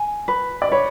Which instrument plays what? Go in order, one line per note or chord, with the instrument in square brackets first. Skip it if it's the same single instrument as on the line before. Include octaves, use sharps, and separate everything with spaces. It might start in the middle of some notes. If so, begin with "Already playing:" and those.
Already playing: [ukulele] G#5
B4
[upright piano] D5
[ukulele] B4 [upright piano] C#5